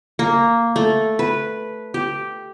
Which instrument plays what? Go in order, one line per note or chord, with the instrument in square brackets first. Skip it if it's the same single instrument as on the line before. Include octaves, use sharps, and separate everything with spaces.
[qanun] A#3
A3
B4
G4